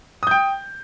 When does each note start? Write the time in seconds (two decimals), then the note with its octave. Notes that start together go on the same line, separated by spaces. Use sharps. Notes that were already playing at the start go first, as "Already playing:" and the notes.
0.23 D#6
0.27 G6
0.31 G5